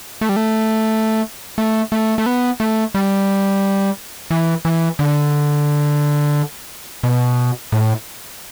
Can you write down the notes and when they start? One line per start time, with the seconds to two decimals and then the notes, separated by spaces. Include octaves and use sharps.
0.21 A3
0.29 G3
0.36 A3
1.58 A3
1.92 A3
2.18 A3
2.26 B3
2.60 A3
2.95 G3
4.31 E3
4.65 E3
4.99 D3
7.03 B2
7.72 A2